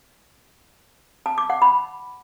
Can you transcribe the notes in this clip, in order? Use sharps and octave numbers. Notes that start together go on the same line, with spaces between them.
A5
D6
F#5
B5